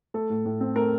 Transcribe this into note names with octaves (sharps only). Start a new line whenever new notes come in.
A3 A4
A2
A2
C4
A3 A#4